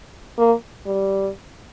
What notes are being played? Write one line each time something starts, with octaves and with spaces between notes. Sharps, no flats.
A#3
G3